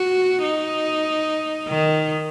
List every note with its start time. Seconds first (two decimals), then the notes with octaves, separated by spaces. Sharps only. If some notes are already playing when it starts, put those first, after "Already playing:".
Already playing: F#4
0.43 D#4
1.69 D#3